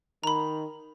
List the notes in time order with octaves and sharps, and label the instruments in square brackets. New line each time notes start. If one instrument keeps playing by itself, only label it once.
[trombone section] D#3 [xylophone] A#5 B5